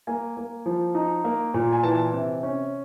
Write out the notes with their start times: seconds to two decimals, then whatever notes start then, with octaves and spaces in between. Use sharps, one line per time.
0.07 A#3 G#5
0.37 A#3
0.66 F3
0.95 D#4
1.24 A#3
1.54 A#2
1.72 G#5
1.83 E3 A5
2.13 C3
2.43 C#4